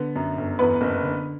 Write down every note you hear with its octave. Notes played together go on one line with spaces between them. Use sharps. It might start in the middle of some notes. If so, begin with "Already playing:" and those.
Already playing: D3 B3
F#2
G1
E2 B3 B4
F#1
D3